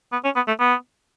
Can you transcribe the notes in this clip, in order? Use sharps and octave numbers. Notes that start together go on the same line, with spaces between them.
B3
C#4
B3
A3
B3